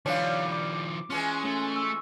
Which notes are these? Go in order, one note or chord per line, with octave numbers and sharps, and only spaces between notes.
D#3 F3 G3 B3 D4 C#5 F5
D6
E3 G#3 C#4 F4
A3 C#4
C#6 E6